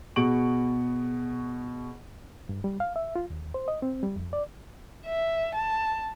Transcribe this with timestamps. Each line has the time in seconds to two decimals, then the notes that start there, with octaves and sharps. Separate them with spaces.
0.16 B2 F#4 G#4 C#6 D7 F#7
2.49 G2
2.64 G3
2.80 F5
2.96 E5
3.16 F4
3.30 D#2
3.54 C5
3.68 D#5
3.82 C4
4.03 G3
4.16 F2
4.33 D5
5.05 E5
5.54 A5